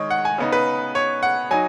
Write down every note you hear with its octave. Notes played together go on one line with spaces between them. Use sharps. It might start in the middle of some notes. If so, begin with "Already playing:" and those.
Already playing: D#3 G#3 C#5 D#5
F#5
G#5
C#3 B3 D#4
B4
C#5
F#5
F#3 D#4 G#5